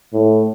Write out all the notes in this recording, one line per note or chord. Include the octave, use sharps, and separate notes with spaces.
A2